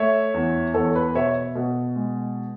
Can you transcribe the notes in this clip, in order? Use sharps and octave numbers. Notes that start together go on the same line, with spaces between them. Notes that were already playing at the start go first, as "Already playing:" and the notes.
Already playing: A3 C#5 E5
E2
E2 A4 C#5
B4
B2 C#5 E5
B2
G#3